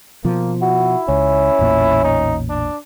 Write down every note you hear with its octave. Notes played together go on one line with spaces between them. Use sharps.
B2 F3 A#3
E4 F#4
C#2 C#4
A1 E2 A#2
D#4
D4